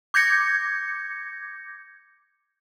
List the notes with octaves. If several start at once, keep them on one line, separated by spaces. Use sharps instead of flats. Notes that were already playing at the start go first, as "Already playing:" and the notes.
D6 G6 G#6 A#6 C#7